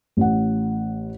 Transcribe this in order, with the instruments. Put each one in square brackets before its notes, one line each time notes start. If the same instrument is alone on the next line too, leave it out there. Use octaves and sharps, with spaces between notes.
[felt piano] A1 F#5